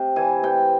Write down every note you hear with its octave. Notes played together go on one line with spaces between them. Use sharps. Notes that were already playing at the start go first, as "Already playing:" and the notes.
Already playing: C3
E3 G#5
C3 G5